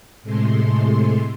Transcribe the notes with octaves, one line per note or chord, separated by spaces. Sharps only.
A2 C3 G#3 A3 C6